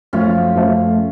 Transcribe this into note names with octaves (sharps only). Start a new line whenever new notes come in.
F#2 F3 A3 C#4 F4
F#2 F3 A3